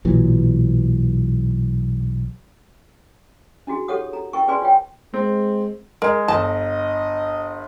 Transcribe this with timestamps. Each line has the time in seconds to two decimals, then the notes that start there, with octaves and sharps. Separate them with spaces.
0.05 B1 A#2 E3 F#3
3.67 D4 E4 F#4 G#4
3.88 G4 A4 C#5 F#5 D#6
4.13 A#5
4.33 E4 A#4 G5 C#6
4.48 G#4 B4 D5 G#5 C6
4.62 F4 C#5 G5
5.14 G#3 C4
6.02 G#3 A#4
6.28 G1 D#5 A5